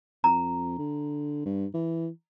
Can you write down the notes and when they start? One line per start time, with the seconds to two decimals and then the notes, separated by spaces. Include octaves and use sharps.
0.24 F2 A#5
0.78 D3
1.46 G2
1.74 E3